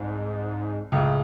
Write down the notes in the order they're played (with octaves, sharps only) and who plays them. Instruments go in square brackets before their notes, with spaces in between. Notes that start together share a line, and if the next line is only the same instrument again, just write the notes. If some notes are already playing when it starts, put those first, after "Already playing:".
Already playing: [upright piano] C2 [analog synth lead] G#2
[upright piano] C#2 C#3 [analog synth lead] A2